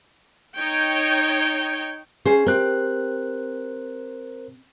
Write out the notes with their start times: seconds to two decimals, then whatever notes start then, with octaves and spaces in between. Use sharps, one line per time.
0.57 D#4 C#5 G5
2.25 C#4 G#4 C5
2.47 C4 G4 A#4 C5 F#6